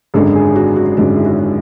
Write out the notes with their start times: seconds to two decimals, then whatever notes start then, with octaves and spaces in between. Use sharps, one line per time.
0.14 G#1 F#2 D3 G#3 D4 A4
0.35 G#4
0.56 F#4
0.76 F#4
0.97 G#1 F#2 D3 G#3 D4 F#4
1.17 E4
1.25 F#4